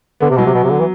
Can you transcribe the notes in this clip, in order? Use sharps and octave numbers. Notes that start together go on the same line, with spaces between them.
D3 B3
C3
B2 F#3
C3
B2
C3
D3
E3